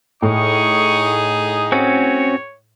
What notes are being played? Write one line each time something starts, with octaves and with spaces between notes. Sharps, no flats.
A2 D#4 G#4 C#6
C4 C#4 F#4 C#5